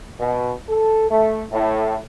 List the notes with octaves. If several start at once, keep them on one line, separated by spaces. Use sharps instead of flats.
B2
A4
A3
A2